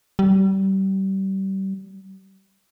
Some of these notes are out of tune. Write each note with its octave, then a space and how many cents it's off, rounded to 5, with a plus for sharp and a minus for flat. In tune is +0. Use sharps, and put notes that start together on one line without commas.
G3 -30